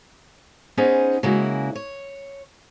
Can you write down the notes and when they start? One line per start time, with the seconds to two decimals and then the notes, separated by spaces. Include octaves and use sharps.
0.77 B3 C#4 D#4 G#4 C5
1.23 C#3 G#3 A#3 E4 F#4
1.75 C#5